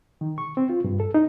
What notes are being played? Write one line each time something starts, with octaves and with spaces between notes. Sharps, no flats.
D#3
C#6
C4
F4
G2
A4
D#4